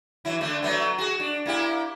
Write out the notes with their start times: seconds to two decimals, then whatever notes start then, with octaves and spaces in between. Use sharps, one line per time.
0.25 E3 F#3 E4
0.41 D3 A3 D4
0.63 F#3 A3 B3
0.98 F#4 G#4
1.20 D4
1.46 A#3 E4 G4